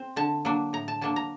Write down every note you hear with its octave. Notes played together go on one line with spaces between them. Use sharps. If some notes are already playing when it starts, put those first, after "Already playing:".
Already playing: C4
D3 A5
F#3 A#3 D4
A2 A#5
A5
F#3 A#3 D4 A5
A#5